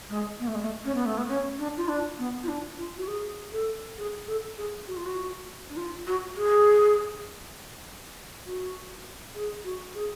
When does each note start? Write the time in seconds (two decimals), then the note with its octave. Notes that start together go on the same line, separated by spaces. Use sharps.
0.10 G#3
0.39 B3
0.47 A3
0.55 G#3
0.62 A3
0.85 C#4
0.95 B3
1.06 A3
1.18 B3
1.29 C#4
1.59 D4
1.77 F4
1.88 D4
2.19 B3
2.43 F4
2.48 D4
2.78 F4
2.97 F#4
3.08 G#4
3.52 A4
3.98 G#4
4.28 A4
4.58 G#4
4.87 F#4
4.96 F4
5.06 F#4
5.70 D4
5.77 F4
6.07 F#4
6.37 G#4
8.46 F#4
9.35 G#4
9.64 F#4
9.95 G#4